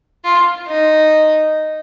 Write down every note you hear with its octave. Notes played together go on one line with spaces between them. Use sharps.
F4
D#4